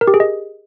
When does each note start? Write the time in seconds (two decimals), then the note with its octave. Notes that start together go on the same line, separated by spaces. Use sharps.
0.01 A#4
0.07 G4
0.14 G#4
0.20 D#5